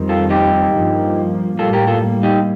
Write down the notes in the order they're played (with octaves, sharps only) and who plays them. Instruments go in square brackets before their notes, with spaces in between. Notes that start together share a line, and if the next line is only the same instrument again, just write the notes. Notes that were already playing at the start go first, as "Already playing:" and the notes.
Already playing: [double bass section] F2 D#3 G3 C4
[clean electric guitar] F4 A4
D#4 G4
[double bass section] G2 F3 A#3
[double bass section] A2 G3 A#3 [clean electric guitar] F4 A4
[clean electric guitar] G4 A#4
F4 A4
D#4 G4